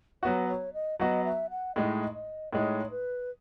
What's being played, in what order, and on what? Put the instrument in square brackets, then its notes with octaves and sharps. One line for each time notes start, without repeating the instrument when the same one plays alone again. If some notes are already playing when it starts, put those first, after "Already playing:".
[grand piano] F#3 B3 F#4 [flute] C#5
[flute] C#5
D#5
[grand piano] F#3 B3 F#4 [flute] D#5
[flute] E5
F#5
[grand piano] A2 G#3 D#4 [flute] D#5
[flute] D#5
[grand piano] A2 G#3 D#4 [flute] C#5
[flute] B4